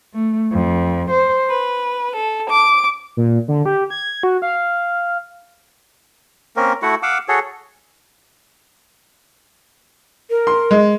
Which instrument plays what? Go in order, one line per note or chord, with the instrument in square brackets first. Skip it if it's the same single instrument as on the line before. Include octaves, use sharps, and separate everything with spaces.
[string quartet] A3
F2
C5
B4
A4
D6
[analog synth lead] A#2
D3
G4
G#6
F#4
F5
[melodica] A#3 C4 C#4 A#4
A3 E4 F#4 F#5
F5 F#5 D6 E6
F#4 G#4 A4 C#5
[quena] A#4
[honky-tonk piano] C6
G#3